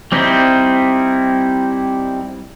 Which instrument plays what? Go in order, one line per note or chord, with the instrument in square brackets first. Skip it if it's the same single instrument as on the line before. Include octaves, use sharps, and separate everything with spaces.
[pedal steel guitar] G3 C4 D#4 E4